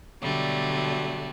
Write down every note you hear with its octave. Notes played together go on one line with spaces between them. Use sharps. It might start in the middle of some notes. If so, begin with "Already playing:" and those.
B2 D3 F#3 G3 A3